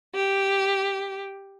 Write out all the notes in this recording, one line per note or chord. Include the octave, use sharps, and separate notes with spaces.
G4